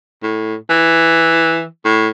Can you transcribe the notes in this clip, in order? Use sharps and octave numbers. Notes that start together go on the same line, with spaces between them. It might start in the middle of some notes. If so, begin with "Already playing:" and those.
A2
E3
A2